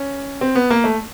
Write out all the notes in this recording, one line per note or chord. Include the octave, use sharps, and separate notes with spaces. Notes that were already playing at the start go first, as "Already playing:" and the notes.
Already playing: C#4
C4
B3
A#3
A3